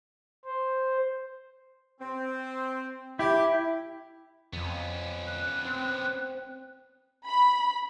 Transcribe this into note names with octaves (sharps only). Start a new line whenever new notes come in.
C5
C4
E4 G4
F2 B3 C#4
F#6
C4
B5